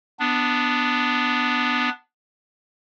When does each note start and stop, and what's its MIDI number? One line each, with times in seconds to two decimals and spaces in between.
0.19 1.89 59
0.19 1.89 62